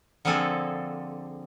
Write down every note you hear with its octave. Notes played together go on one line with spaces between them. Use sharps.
D3 F3 A#3 C4 G#4 A4